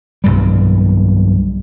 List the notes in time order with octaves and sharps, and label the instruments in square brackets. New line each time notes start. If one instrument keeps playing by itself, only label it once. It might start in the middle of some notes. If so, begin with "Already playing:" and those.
[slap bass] B1 G2 G3